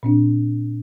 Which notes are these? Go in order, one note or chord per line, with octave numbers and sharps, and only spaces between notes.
A#2 C4 D4